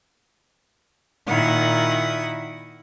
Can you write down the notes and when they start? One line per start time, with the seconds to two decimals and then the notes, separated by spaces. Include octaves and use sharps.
1.27 A#2 D#3 E4 F#5 D#6